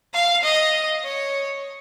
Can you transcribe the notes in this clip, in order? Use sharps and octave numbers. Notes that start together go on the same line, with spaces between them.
F5
D#5
C#5